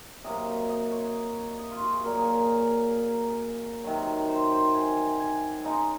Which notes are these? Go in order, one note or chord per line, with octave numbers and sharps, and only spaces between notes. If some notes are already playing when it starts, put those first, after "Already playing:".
C3 F#3 A#3 D#5
D#5
C#5
D#5
F4
F#4
G#4
A#2 F#3 A#3 A#4
G#4
A#4
C3 D#3 F#3
C5
C5
G#5
G#5
C#3 G#3 D#4 A#5